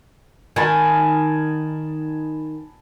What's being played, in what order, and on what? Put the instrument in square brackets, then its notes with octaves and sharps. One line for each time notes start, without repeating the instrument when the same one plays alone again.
[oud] D#3 [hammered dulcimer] G#5 A5 B5